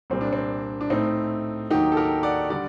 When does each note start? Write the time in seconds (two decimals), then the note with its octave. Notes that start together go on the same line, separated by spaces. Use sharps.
0.10 C2 A#2 G3 C4
0.21 D4
0.33 C4
0.81 D4
0.90 A2 A3 C4 D#4
1.70 D#2 D#3 F#3 D#4 G4
1.92 A4
1.97 G4 A#4
2.23 D5 F#5
2.50 D3 G3 D5 F#5